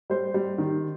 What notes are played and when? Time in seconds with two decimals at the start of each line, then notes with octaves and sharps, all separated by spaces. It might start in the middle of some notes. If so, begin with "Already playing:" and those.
0.10 G3 C5
0.34 G3
0.58 D#3